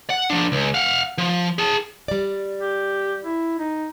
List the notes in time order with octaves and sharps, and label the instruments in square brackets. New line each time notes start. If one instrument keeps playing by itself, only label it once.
[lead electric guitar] F#5
F3 D4
C#2
F5 F#5
F3
G#4 A5
[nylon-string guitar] G3 D5
[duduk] G4
E4
D#4